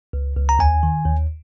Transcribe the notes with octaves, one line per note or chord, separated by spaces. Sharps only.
C#2
C#2
A#5
D#2 G#5
D#3
D#2